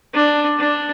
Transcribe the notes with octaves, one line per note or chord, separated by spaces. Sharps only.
D4
D4